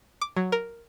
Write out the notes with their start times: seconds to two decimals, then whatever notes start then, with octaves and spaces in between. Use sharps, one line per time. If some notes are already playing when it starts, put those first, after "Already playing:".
0.21 D6
0.36 F#3
0.52 A#4